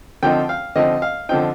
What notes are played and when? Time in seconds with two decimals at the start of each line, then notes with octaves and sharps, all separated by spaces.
0.23 D3 F3 C4 D#4 G5
0.49 F5
0.76 D3 F3 C4 D#4 D#5
1.02 F5
1.29 D3 F3 C4 D#4 G5